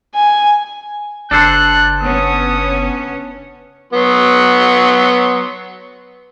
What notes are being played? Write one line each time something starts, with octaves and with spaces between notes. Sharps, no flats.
G#5
F#1 D4 A4 C5 F#6
B3 C#4 D#6
F#3 B3 C6